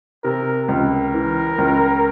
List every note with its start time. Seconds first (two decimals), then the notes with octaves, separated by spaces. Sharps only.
0.24 C3 A#4
0.69 C#2 A#4
1.14 E3
1.58 C#2